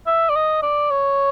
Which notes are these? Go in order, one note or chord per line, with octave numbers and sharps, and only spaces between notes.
E5
D5
D#5
D5
C#5